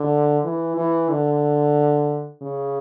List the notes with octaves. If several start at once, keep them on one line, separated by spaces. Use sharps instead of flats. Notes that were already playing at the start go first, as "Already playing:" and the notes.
Already playing: D3
E3
E3
D3
C#3